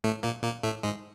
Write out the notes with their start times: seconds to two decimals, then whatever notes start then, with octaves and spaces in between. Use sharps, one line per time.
0.04 A2 A3
0.23 A#2 A#3
0.43 A#2 A#3
0.63 A2 A3
0.83 G#2 G#3